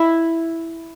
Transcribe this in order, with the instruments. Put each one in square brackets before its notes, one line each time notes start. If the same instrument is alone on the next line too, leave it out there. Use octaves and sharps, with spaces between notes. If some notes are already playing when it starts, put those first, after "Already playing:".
Already playing: [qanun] E4